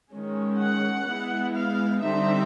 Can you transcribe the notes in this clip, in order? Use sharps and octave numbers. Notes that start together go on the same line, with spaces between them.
D#3 G#3 C#4
F#5
G#3 B3 E4
F5
D3 G3 C4 D#4 E5